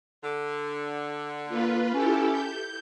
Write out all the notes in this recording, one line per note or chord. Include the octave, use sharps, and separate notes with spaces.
D3
A#3 F4 B4
C#4 E4 G4 A4
G6